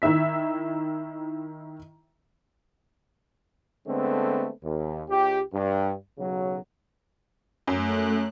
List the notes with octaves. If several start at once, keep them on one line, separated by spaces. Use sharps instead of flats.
D#3 E4 E5 B6
D3 G#3 A3 B3 C4
D#2
C#2 G4
G2
B1 C#3 F#3
F#2 A3 F#6